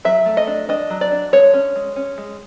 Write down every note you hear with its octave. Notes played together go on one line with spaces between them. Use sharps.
F#3 E5
A3
D#5
D4
D4 D#5
F#3
D5
D4
G#3 C#5
C#4
G#3
C#4
G#3